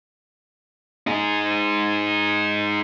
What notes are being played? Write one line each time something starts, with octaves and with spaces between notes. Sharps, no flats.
D#4 G#4